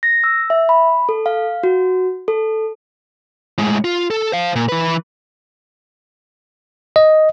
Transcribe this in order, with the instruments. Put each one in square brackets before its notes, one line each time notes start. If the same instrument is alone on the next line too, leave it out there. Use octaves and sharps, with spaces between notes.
[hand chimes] A#6
E6
E5
B5
A4
F5
F#4
A4
[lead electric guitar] A2 G#3
F4
A4
C5 F5
A#2
E3 B4
[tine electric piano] D#5